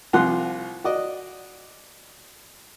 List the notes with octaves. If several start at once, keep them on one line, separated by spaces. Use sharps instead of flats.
C2 F3 F4 F#5 C6
F#4 D5 D#5